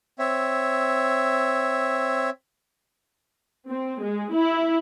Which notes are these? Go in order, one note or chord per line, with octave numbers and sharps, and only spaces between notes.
C4 C#5 E5
C4
G#3
E4